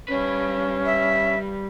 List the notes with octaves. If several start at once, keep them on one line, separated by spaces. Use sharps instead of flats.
G3 C#4 B4
E5